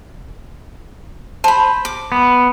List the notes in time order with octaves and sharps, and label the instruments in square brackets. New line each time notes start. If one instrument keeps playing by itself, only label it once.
[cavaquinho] C5 B5 [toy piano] A5
[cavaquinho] D6
[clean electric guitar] B3